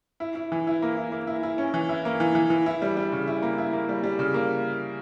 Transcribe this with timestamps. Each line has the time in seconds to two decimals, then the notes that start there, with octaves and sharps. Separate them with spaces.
0.20 E4
0.35 E4
0.52 E3
0.67 E4
0.82 A#3
0.97 E4
1.12 A#3
1.27 E4
1.43 E4
1.58 C#4
1.74 E3
1.89 E4
2.05 A#3
2.20 E3
2.35 E3
2.50 E3
2.66 E4
2.82 G3
2.97 G3
3.12 C#3
3.28 E4
3.43 A#3
3.58 E4
3.73 A#3
3.89 G3
4.04 G3
4.19 C#3
4.34 A#3